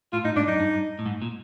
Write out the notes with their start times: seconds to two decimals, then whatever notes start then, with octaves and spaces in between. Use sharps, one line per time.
0.13 A2 F4
0.24 A2 D#4
0.36 G#2 D4
0.48 F#2 D#4
0.60 G2
0.99 A2
1.06 G#2
1.22 A#2